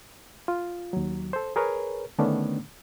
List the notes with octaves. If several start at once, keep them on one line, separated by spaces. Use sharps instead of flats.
F4
D#2 F#3
A4 C5
G#4 A#4 B4 C#5
D3 D#3 A3 B3 C#4 D4